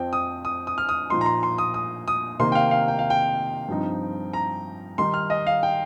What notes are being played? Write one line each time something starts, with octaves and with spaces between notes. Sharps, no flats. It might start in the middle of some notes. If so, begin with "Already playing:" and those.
Already playing: F2 F3 C4 G5
D#6
D#6
D#6
F6
D#6
A#2 F3 D#4 C6
A#5
C6
C6
D#6
D#6
D#6
C3 D#3 A#3 D#4 C6
G5
F5
F5
G5
F5
G5
G2 F3 C4 D#4
A#5
D#3 G3 D#4 C6
F6
D#5
F5
G5